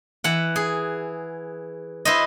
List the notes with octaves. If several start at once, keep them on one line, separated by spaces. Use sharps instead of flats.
E3 F#5
G#4
E4 B4 C5 D#5